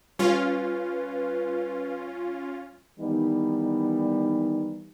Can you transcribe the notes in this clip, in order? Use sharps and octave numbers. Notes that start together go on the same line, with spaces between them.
G3 C#4 F4 B4 F6
D#3 E3 G3 B3 D#4